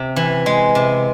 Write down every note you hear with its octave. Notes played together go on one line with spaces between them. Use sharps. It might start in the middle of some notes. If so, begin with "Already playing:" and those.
Already playing: C3
E3
G#3
C3